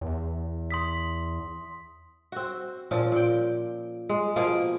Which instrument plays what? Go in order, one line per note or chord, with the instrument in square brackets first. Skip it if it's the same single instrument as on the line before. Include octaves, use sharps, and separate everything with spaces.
[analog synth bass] E2
[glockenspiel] C6 D#6 B6
[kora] C4 F#4
A#2 F3 C#4
A#2 G5
G#3
B2 F3 A#3 G#4